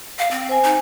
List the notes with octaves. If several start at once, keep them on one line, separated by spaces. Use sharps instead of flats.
F5
C4
C5 G#5
D#4